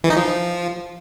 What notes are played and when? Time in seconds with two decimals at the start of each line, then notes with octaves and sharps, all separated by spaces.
0.04 E3
0.10 D#4
0.17 F3